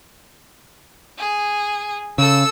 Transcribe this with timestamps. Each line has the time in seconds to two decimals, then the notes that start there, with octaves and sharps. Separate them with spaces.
1.19 G#4
2.18 C#3 A4 E6